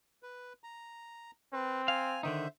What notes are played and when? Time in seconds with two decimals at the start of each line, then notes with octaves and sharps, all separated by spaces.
0.23 B4
0.64 A#5
1.53 C4 B4
1.88 F5 G#5
2.23 D3 D#3 D#4 C5 E5